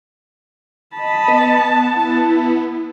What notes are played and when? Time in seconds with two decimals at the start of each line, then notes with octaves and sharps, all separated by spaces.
0.96 D#5 A5 B5
1.28 B3
1.95 E4